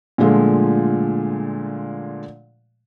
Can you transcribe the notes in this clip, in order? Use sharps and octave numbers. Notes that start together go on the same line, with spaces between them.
A#2 D3 F3 G#3 A3